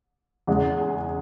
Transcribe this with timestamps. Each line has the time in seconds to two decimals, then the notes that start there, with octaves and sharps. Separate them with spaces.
0.47 E2 C#3 G#3
0.81 G#4